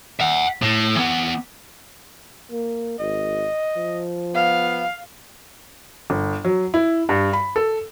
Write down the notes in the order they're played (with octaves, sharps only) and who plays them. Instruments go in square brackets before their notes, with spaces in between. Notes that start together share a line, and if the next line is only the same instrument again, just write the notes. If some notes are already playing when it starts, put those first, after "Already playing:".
[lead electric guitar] E5 F#5
A2
E3 B3
[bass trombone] A#3
[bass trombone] G#1 [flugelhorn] D#5
[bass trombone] F3
[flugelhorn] B3 [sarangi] F5
[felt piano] G1
F#3
E4
G2
B5
A4